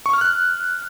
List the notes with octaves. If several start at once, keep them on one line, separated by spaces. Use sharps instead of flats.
C#6
F6
F#6